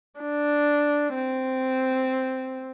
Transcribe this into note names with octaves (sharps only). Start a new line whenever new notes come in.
D4
C4